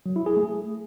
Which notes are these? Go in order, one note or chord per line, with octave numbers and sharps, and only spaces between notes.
F#3
E4
G#4
A3